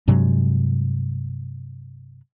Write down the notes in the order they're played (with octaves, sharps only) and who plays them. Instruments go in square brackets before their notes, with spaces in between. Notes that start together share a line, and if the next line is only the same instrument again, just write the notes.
[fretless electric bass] G2 C3 F#3 G#3